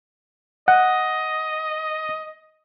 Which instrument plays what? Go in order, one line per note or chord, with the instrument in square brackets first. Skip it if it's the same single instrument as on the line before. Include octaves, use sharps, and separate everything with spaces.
[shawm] D#5 [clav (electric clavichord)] F#5